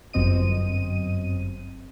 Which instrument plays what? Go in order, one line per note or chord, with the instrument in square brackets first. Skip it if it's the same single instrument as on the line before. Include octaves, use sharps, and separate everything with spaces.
[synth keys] G1 F#2 C4 D#5 D#7